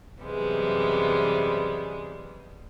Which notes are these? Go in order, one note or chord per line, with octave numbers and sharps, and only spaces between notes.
F#2 C3 E3 G3 G#3 B3